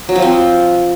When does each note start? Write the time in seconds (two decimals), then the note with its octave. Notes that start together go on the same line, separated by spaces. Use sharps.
0.09 F#3
0.16 F3
0.22 C4